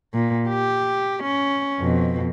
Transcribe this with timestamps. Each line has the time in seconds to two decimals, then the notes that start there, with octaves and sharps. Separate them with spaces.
0.14 A#2
0.49 G4
1.24 C#4
1.79 F2 B2